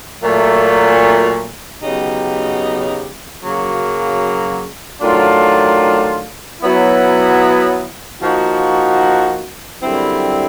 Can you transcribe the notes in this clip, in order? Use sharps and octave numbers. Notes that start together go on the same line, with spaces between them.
A#2 F#3 A3
C#3 F#3 B3 D#4 G4
F#2 C#3 F#3 A#3
D#3 F#3 A3 D4 F4
F#3 B3 E4
F3 A#3 D#4 F#4
F#2 D3 G3 C4 E4